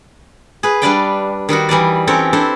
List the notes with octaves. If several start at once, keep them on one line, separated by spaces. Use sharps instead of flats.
G#4 B4
G3 D4 B4 D5 F5 G5
D#3 G3 D#4 F#4
E3 G3 D#4 D5
C4 C#4 G4 A4 A#4 C#5
D4 E4 A4 C5